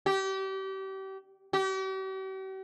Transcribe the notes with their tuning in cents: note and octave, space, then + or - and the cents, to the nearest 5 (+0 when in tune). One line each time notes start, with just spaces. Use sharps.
G4 -30
G4 -45